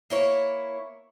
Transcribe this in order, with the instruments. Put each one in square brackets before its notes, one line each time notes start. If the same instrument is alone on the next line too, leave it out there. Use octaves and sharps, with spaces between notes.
[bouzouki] A#3 E4 C#5